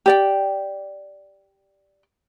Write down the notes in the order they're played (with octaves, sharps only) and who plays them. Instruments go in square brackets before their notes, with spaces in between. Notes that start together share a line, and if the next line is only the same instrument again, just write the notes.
[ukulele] G4 D5 G5